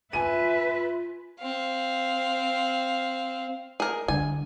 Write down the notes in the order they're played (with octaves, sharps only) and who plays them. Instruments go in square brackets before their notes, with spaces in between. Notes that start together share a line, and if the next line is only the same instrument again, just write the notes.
[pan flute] F4 [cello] B4 E5 [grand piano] G#5 D#7
[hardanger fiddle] C4 F5
[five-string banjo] G#4 A#4
[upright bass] D3 G3 [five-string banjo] G#5